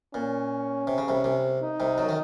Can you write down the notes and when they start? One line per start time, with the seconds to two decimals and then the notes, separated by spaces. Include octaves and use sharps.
0.14 A#2 C#4
0.87 C3
0.98 C#3
1.08 C2 C3
1.24 C2 C3
1.62 D#4
1.80 C2 C3
1.98 F#2 F#3
2.09 D#3